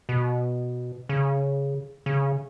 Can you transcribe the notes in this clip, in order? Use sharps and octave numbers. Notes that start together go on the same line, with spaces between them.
B2
C#3
C#3